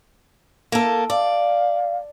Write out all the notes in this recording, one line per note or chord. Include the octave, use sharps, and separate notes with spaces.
A#3 A4
D5 F5